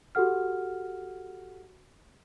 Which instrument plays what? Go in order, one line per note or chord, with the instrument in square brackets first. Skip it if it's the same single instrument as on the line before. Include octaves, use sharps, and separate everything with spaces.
[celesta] F#4 G4 A4 F#5 F6